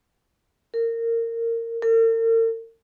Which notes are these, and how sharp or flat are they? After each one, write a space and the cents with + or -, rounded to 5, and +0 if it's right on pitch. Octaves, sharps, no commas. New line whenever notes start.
A#4 -20
A#4 -45